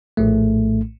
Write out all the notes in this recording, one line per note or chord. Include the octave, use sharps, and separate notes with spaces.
A#1 A2 A3